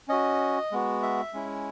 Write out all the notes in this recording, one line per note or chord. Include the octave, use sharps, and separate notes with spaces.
C#4 F#4 D#5
G#3 B3 F#4
E5
G#3 C#4 E4